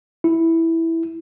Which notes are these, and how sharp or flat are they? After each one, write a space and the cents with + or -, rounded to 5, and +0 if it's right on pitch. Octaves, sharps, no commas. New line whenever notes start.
E4 -5